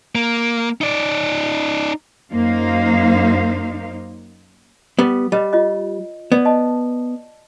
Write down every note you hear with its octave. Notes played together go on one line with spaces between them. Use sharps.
A#3
D#4 D5
F#2 A#3 D#4 C5 F5
G3 B3
G3 B4 C#5 D#5
F4 C#5 D#5
B3 D5
D#5 A5